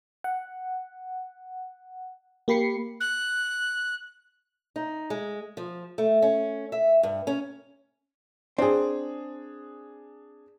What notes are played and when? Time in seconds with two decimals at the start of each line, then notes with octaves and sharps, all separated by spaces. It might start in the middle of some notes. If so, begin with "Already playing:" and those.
0.24 F#5
2.48 A#3 G4 B5 C7 C#7
3.00 F#6
4.76 D#4
5.10 G#3
5.57 F3
5.98 A3
6.22 C#4
6.72 E5
7.03 G2
7.27 C#4
8.58 C4 D4 G#4